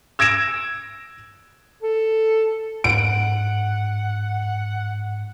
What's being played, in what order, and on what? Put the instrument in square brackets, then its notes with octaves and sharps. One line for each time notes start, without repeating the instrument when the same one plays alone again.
[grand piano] E6 G#6 A#6 D7 E7
[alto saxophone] A4
[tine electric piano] G#2 [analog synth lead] F#5 [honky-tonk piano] D7